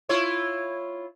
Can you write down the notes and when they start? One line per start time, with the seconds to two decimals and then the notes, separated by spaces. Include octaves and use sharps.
0.09 E4 F4 C#5